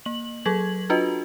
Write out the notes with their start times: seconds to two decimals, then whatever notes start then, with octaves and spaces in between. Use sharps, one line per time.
0.05 A#3 F#7
0.45 F#3 G#4 A4 G#6 F#7
0.90 D4 F4 F#4 B4 D#5